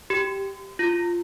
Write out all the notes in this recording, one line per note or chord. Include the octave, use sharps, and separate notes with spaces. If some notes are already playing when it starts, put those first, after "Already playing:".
G4
F4